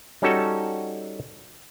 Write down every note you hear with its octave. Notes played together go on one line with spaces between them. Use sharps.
G3 C#4 D#4 F#4 A4